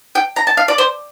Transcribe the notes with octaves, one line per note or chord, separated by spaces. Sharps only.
G5
A#5
A5
F5
D5
C5